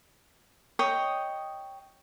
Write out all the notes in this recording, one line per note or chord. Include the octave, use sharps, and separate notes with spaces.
C#5 D#5 G5 D#6